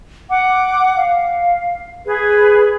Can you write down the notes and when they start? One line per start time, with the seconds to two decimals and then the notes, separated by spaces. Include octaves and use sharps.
0.29 F#5 D6
0.97 F5
2.05 G#4 B4